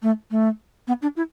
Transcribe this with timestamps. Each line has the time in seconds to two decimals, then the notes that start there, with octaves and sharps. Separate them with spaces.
0.02 A3
0.31 A3
0.88 B3
1.02 D4
1.16 E4